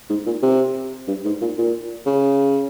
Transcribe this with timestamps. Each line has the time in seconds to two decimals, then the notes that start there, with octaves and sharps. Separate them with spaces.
0.10 G#2
0.26 A#2
0.43 C3
1.08 G2
1.25 G#2
1.41 A#2
1.58 A#2
2.06 C#3